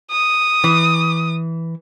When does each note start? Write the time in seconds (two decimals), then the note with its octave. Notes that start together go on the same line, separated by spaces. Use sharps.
0.11 D#6
0.64 E3